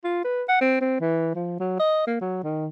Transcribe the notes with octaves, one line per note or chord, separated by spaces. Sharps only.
F4
B4
F#5
C4
C4
E3
F3
F#3
D#5
A#3
F#3
D#3